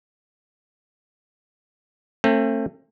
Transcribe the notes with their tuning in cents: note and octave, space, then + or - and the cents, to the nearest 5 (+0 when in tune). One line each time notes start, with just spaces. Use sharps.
A3 +30 C4 +40